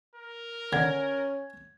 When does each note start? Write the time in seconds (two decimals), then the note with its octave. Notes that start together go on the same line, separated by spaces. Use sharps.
0.15 A#4
0.73 D3 C#4 G#6